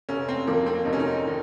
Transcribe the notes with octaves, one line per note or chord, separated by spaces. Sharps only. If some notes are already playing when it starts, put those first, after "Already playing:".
F1 C#4
C4
F2 D#3 A#3
C4
F1 D#4
C#4
D#4
D#3